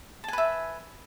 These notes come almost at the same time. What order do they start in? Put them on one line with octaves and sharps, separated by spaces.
A5 G#5 B4 E5